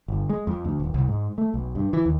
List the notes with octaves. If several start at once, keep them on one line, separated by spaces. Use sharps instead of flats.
G1
G#3
F2
D2
D#1
C2
G#2
A3
B1
G2
E3
D#2